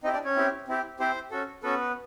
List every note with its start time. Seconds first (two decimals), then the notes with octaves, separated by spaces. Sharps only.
0.03 C4 D#4 E4 G4 D#5
0.13 D4 D5
0.25 C#4 C#5
0.36 C4 E4 G4
0.68 C4 E4 G4
1.00 C4 E4 G4 C5
1.31 C#4 F#4 A4
1.63 B3 C#4 F#4 A4 B4